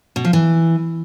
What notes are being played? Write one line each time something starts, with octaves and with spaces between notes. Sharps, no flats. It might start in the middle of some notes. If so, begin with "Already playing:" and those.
B2
F3
E3